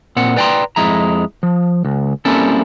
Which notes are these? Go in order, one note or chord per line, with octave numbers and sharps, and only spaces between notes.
A#2 C4 F#5
B4 D5 G5 G#5 A#5 C6
F2 G#3 E4 A#5
F3
C#2
G3 A#3 C4 C#4 E4 A4